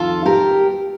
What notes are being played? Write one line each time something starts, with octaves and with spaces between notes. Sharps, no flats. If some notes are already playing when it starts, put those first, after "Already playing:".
Already playing: F2 D#3 F4 A4
G4 A#4